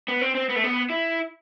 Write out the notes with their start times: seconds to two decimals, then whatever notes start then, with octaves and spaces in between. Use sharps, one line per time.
0.08 B3
0.21 C4
0.35 C4
0.49 B3
0.56 A3
0.64 B3
0.90 E4